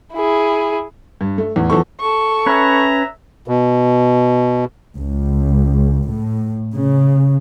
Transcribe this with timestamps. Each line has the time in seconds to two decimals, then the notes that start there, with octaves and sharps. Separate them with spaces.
0.14 E4 G#4
1.21 G2
1.38 A3
1.56 E2 A2
1.70 E2 F3 A4 C#6
2.00 A4 C#6
2.46 C#4 B4 C#5 E5 A#5
3.48 B2
4.96 C#2
6.10 A2
6.73 C#3